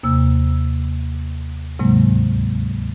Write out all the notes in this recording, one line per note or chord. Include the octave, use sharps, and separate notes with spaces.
D#2 C3 A#3 E6
D2 G#2 C3 F#3 G#3 A#3